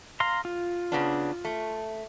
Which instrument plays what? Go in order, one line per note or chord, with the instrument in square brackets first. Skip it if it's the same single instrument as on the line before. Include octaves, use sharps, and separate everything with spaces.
[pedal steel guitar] F5 A#5 C6
F4
[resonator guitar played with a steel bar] C#3 B3 D4
A3